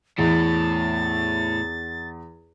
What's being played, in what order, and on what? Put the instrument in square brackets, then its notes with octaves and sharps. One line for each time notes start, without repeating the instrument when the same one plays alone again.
[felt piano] E2 [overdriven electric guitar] A2 [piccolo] A6